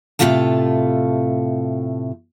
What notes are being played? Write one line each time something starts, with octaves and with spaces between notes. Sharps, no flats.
A2 C3 D#3 A3 F4 A5